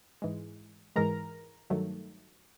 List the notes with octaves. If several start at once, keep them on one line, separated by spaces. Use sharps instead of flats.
G#2 E3 G#3
G#2 E3 G#3 A#4 A#5
G2 D#3 F#3 A3